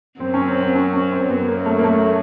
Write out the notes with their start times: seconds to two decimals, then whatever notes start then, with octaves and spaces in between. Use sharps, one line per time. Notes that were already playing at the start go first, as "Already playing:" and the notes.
0.20 F#2 F#3 C4
0.34 C#4
0.47 C4
0.60 C4
0.75 C#4
0.93 C#4
1.11 C4
1.29 F#2 F#3 B3
1.48 A#3
1.66 A3
1.78 A#3
1.84 A3